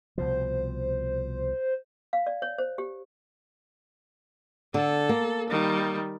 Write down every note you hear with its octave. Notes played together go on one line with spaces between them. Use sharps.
C2 B2 F3 C5
F5
D5
C#5
C5
G4
D3 A4
A#3
D#3 G3